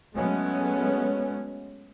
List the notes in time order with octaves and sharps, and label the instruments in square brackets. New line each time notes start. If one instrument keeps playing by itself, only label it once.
[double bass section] F#3 G#3 A3 B3 C#4